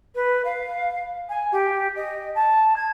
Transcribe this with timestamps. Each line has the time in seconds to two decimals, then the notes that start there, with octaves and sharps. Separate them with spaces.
0.15 B4
0.45 F5
1.29 G#5
1.52 G4
1.95 D#5
2.35 A5
2.76 G#6